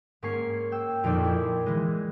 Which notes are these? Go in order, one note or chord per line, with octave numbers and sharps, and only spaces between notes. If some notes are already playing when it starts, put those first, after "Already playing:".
G#2 A#3 C#4 G#5 C#6 C7
G5 E6
F2 A#2 D#4 D5 G6
E4
E3 G#3